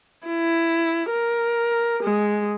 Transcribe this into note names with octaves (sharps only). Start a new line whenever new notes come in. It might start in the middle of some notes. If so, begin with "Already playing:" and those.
E4
A#4
G#3